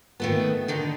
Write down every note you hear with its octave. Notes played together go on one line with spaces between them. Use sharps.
D#3 A3 B3
D3 D#3 D#4